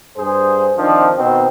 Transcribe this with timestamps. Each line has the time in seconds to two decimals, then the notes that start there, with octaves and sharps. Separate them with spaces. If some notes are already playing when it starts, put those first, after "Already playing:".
0.16 G2 G#4 C5
0.77 D#3 F3 C4 D4
1.16 B2 D#3 C4